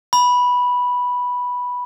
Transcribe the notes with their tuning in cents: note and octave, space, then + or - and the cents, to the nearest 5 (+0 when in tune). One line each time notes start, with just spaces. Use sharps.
B5 -5